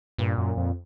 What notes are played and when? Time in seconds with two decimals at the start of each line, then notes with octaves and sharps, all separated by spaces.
0.18 G2 A#2
0.38 F#2
0.57 F2